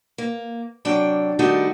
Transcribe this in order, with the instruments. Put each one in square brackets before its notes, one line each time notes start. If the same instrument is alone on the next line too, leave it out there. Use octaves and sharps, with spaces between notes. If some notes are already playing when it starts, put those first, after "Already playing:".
[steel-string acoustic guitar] A#3
C3 F#3 D4 G5
D#3 G3 A3 D4 D#4 F#4